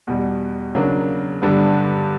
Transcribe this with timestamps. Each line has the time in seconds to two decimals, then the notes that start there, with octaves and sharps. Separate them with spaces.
0.07 E2 B2 G3
0.75 C#3 F#3 A#3 D4
1.42 G2 D3 G3 B3 D4